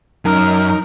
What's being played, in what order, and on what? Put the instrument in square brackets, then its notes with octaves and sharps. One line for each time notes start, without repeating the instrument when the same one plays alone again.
[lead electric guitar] F#2 [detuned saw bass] D#4 [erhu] A#4